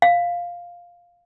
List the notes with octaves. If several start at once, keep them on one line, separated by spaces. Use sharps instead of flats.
F5